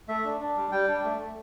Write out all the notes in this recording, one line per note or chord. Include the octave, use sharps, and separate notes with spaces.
A3 E5
D4
D4
G3
G3 G5
D4
A3
A3